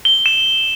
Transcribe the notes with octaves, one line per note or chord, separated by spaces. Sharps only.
G7
E7